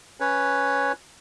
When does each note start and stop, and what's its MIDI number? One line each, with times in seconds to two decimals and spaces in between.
0.20 0.92 61
0.20 0.92 71
0.20 0.92 73